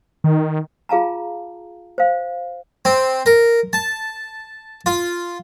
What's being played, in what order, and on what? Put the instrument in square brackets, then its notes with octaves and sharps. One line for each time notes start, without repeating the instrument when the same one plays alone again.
[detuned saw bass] D#3
[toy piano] F4 G#4 F5 A5 A#5
C5 F5
[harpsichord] C4
A#4
A5
F4